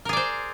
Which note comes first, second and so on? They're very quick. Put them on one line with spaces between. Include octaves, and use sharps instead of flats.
A#4 G#4 D5 C5